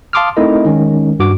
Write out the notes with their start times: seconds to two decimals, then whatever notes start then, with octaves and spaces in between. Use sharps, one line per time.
0.13 F5 A5 C6 D6 D#6 F6
0.37 A3 C4 D#4 E4 A#4 D#5
0.65 D#3 G#3 C#4
1.19 G2 F#4 D6